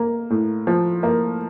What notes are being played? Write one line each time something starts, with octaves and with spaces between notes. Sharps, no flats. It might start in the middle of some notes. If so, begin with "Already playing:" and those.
Already playing: A#3
A2
F3
A#3